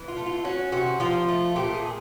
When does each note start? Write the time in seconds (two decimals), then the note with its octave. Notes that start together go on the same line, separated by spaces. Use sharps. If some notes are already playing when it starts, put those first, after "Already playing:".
Already playing: E3
0.08 F4
0.16 A3
0.26 F4
0.44 C#4 F#4
0.72 C3 F#4
1.00 F3 F4
1.28 A3
1.56 A#2 G4
1.74 G#4
1.84 A#2